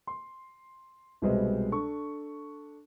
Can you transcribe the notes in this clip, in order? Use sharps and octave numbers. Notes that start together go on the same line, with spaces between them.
C6
C2 B2 G3 G#3 C5 D#5
D4 A4 C#6